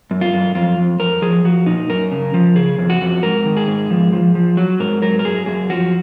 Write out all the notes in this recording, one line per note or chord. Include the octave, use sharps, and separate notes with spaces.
F#2
F4
F#2
F2 F4
F2
F2 A#4
F3 G#4
F3 F#4
A#2 D#4
F#2 A#4
C#3
F3
C#3 G#4
F2
F#4
F2
G#2 A#4
D#3
G#4
G#2
F3
F3
F3
F#3 F#4
G#2 A#4
F#3 A#4
A#4
F#2 G#4
F#2 G#4
F3 F#4